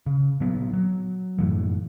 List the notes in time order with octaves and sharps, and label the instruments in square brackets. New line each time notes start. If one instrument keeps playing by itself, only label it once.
[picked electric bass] C#3
A#2 F#3 B3
F#3
F#2 A2 E3